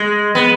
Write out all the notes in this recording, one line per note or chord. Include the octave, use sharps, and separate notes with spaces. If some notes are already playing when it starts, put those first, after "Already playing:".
Already playing: G#3
B3